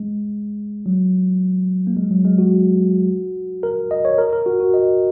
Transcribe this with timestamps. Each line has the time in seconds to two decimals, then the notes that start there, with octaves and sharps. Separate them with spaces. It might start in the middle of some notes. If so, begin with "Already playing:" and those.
Already playing: G#3
0.86 F#3
1.87 A#3
1.96 G#3
2.11 F#3
2.24 G#3
2.38 F#4
3.63 A#4
3.91 D#5
4.05 C#5
4.18 A#4
4.33 A#4
4.46 F#4
4.60 F#4
4.74 D#5